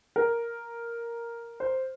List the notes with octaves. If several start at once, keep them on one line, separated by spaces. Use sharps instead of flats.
A#4
C5